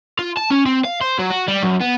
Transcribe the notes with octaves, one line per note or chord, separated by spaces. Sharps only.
F4
A5
C#4
C4
F5
C5
F#3
F#4
G3
F#2
B3